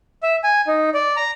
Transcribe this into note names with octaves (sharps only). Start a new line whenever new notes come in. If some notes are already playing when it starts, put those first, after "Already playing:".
E5
G#5
D#4
D5
A#5